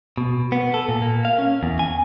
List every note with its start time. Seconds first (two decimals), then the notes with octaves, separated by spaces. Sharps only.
0.18 B2
0.52 B3
0.74 A4
0.89 A#2
1.02 A#3
1.25 F5
1.39 C#4
1.63 E2
1.79 G#5